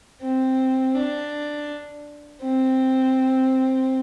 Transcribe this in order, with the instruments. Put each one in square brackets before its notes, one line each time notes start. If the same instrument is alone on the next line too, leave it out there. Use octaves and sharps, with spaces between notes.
[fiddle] C4
D4
C4